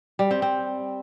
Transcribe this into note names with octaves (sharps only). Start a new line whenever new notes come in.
G3
C4
C4